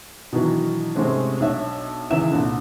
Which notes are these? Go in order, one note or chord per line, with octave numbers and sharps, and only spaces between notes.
B2 D#3 E3 F#3 D4
G#2 C3 G#3 A3 C4 C#4
B1 D4 C#5 E5
C#2 D#3 E3 E5 E7
C2 A#2 D3